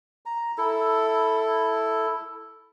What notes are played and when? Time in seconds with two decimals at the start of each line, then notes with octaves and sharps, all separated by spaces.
0.26 A#5
0.58 E4 A4